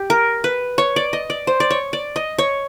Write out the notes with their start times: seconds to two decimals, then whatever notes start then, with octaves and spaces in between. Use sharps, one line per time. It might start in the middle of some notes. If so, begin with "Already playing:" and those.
Already playing: G4
0.10 A#4
0.44 B4
0.78 C#5
0.96 D5
1.13 D#5
1.30 D5
1.47 C5
1.60 D5
1.70 C#5
1.93 D5
2.16 D#5
2.38 C#5